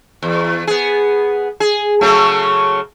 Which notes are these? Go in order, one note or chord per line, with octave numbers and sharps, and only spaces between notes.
E2
B3 G#4
G#4
C#3 F#3 A3